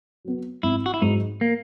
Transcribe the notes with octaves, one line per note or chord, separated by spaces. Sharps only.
F#3 B3
G#1 E4
F#4
E4
G#2 F#3 D#4
A#3